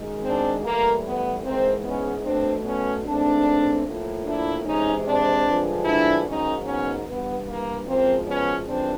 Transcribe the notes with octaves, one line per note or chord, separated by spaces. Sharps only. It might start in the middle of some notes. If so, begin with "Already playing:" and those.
Already playing: F#2 D#3 G#3
C4 D4
A2 E3 G3 A#3
B3
G#2 E3 G#3 A#3 C4
B3 C#4
B2 F#3 A3 C4 D4
B3 C#4
G#2 E3 A3 C4 D4
A2 F3 A#3
D4 E4
C3 E3 G#3 C#4 D#4
C4 D4
G2 D3 F3 G#3
D4 E4
G#2 D#3 F#3 A#3 C#4 D#4
B3 C#4
G2 E3 G3 B3
A#3
F#2 C#3 F3 G#3 A#3 C4
B3 C#4
F2 C#3 E3 G3 C4 D4